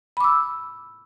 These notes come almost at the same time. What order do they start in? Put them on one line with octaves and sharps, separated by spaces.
B5 D6 E6